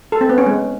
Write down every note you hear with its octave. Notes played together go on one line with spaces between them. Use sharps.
A4
C4
B3
C#4
G#3